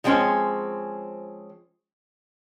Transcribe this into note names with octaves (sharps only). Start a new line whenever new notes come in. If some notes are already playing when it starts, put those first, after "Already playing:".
F3 G#3 C4 C#4 G#5